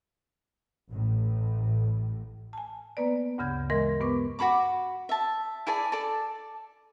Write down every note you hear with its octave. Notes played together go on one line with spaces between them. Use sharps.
A1 A2
G#5 A5
A#3 B3 B4 D5
D2 G2 C#3 G6 G#6
E3 G#3 A#4 D#5 C6
G2 B3 B4 C#6 D6
F#4 A4 B5 D6
E5 A5
E4 G#4 D5 A5
A4 D5 A5